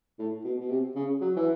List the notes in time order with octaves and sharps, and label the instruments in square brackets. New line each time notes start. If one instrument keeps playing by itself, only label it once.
[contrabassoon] A2
B2
B2
C3
C#3
F#3
E3